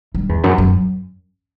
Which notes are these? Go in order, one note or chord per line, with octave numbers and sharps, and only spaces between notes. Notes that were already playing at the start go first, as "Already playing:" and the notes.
G2
E2
F#2
F#2